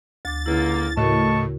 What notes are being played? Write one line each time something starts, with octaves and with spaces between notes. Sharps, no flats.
D2 D6 A6
C#2 D3 A#3 E4
A2 C#3 F#4 A#4 D#5 A5 C#6